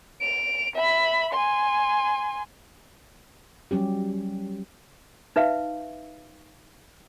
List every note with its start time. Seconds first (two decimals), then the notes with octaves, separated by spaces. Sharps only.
0.21 D7 F7
0.76 E5 B5
1.33 G#5 C6
3.71 F#3 G3 C#4 G4
5.36 D#4 B4 E5 F5